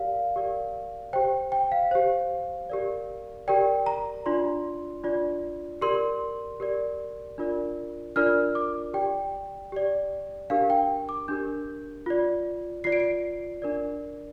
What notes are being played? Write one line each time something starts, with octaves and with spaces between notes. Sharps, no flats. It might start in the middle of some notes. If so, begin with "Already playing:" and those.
Already playing: G4 A#4 D5 F5
G4 A#4 D5
G4 C5 G5
G5
F5
G4 C5
G4 A#4 D5
G4 A#4 D5 G5
A#5
D4 F4 D5 C6
D4 F4 D5
G4 A#4 D5 C6
G4 A#4 D5
D4 F4 A#4 D5
D4 F4 A#4 D5 F6
D6
G4 D5 G5
G4 D5
D4 G4 A#4 F5
G5
D6
D4 G4 A#4 G6
F4 D5
F4 D5 C7
D7
C7
D4 A#4 D5